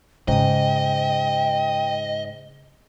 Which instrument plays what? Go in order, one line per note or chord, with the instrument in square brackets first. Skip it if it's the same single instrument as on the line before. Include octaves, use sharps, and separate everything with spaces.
[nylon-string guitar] G#2 [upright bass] C#3 [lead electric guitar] D#5 [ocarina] G5